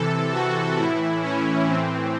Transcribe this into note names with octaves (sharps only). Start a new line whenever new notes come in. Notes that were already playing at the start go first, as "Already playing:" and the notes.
Already playing: C3 E3 A4
F#4
A2 E3 E4
C#4
A2 E3 C4